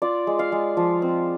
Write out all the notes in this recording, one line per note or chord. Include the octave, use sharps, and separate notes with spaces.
F4 D5
G#3
F5
G#3
F3
C4